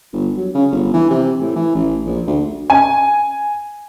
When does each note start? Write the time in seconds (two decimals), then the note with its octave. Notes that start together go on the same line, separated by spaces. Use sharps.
0.13 G1
0.37 F#3
0.55 C#3
0.72 G1
0.93 E3
1.10 C3
1.40 A2
1.56 E3
1.75 A1
2.06 A#1
2.27 D2
2.70 G#5